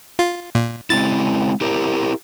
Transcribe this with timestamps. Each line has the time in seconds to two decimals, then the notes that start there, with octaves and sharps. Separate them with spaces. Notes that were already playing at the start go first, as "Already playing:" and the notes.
0.19 F4
0.55 A#2
0.90 G#3 C4 E4 A6
1.61 E4 G4 A#4